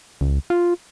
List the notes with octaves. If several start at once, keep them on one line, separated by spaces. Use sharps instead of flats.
C#2
F4